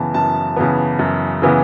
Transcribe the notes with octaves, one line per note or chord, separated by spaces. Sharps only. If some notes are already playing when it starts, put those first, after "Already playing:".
Already playing: F#2 C#3 E3 B3 A5
F#2 A5
C#3 E3 B3
F#2
C#3 E3 B3